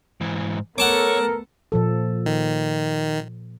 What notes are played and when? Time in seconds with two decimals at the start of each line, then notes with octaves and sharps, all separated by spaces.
0.21 G#2 E3
0.78 A3 B3 A4 A#4 C#5 F#5 A5 D6
1.72 A#2 F3 A4
2.26 D#3